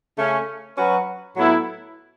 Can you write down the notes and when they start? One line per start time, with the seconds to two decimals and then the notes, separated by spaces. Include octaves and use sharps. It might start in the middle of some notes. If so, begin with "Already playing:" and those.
0.18 C#3 A3 C#4
0.77 F#3 C#4 F#4 B4
1.36 A2 F#3 B3 E4 A4